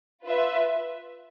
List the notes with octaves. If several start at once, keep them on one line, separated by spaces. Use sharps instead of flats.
F4 B4 E5